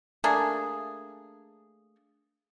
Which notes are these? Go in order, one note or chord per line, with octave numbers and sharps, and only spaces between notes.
A3 A#3 D4 G#4